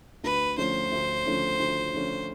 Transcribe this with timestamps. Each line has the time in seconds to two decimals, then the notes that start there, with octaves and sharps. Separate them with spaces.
0.24 D2 B4
0.57 D3 F3 A3 C#4 C5
0.92 D2
1.25 D3 F3 A3 C#4
1.59 D2
1.94 D3 F3 A3 C#4